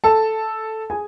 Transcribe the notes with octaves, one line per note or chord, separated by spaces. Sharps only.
A4 A5
G#4 G#5